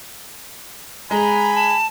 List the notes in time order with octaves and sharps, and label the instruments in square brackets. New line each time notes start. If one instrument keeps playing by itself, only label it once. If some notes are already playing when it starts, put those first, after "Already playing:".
[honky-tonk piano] G#3 [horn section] G#5 B5 [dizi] A#5
[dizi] A5